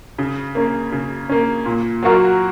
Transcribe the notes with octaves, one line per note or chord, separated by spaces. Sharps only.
C#3
A#3 C#4
C#3
A#3 C#4
A#2
F#3 A#3 F#4 A#4